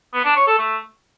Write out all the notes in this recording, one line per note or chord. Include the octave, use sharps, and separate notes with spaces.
B3
D4
C#5
A4
A3